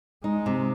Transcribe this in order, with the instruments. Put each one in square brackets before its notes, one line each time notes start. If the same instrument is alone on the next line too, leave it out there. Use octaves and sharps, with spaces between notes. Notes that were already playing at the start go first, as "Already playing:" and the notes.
[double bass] G#3 [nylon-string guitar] D#4
[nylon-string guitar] C3